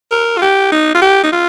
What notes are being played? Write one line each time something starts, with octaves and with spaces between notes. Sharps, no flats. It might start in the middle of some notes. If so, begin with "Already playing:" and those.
A#4
F4
G4
D#4
F4
G4
D#4
F4